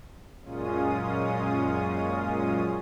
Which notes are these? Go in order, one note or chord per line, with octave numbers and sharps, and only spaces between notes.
F#2 A#2 G#3 C#4 F4 D#6